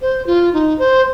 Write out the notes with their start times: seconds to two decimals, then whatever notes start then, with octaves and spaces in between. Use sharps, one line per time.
0.02 C5
0.27 F4
0.53 D#4
0.79 C5